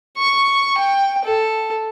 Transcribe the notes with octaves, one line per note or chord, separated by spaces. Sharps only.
C#6
G5
A4